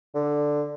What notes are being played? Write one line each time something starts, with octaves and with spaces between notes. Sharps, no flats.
D3